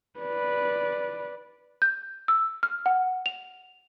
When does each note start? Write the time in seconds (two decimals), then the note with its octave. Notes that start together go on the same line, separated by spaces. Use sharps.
0.20 B4 D5
1.82 G6
2.28 E6
2.63 F6
2.86 F#5
3.26 F7